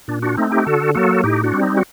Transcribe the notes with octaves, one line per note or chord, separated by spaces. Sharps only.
A#2 D4
D4 F#4
A3 C4 D#4
D#4 G4
D3 F#4 A4
F#3 A#3 F#4 A4
A2 D#4 G4
D4 F#4
G3 C4
D#4
F#4